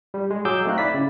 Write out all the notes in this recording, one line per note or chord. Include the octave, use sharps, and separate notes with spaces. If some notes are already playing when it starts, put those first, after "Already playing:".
G3
G#3
F#3 G#4 D6 E6 G6
A3 C4 D#4 F5 F#6
E4 D5 B6
C#3